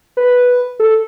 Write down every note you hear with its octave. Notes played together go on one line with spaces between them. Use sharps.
B4
A4